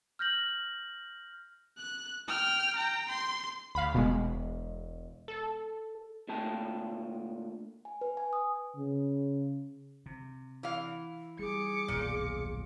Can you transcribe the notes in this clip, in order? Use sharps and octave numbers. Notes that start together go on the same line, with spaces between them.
F6 G6 A#6 F#7
F#6
G5 F6
G5 A#5
C6
D2 F5 B5
E1 B2 G#3
A4
A#2 D3 A3 G5 A5
G#5
B4
G#5
D#6
C#3
C3
E3 F5
G3 G#4 D6 C#7
D#1 B1 F#2 A#2